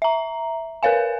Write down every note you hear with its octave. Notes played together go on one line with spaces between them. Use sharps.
E5 A#5
A#4 B4 C#5 F5 G#5